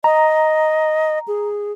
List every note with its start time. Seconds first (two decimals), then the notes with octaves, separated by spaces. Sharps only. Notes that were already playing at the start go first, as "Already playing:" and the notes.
0.04 D#5 A#5
1.28 G#4